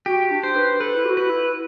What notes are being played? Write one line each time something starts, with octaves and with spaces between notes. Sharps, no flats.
F#4 G4
D4
C5
B4
A4 B4
E4
G4
F#4
B4
E4